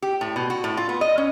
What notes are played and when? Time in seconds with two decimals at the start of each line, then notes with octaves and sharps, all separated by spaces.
0.02 G4
0.21 A2
0.36 B2
0.50 F#4
0.64 A2
0.77 F4
0.89 B3
1.01 D#5
1.18 C#4